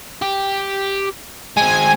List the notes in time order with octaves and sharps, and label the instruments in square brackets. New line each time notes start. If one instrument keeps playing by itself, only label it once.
[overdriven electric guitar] G4
[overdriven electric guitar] G#3 C4 [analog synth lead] G#5